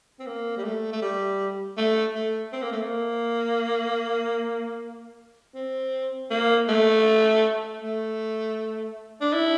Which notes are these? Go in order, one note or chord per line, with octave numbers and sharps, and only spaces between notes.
C4
A#3
G3
A3
A3
G3
A3
A3
C4
A#3
A3
A#3
C4
A#3
A3
A3
D4
E4